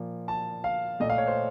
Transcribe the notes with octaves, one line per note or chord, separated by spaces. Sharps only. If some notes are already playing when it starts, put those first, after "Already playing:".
Already playing: A#2 F3 A#3
A5
F5
A#2 A3 D#5
F5
C#5
C5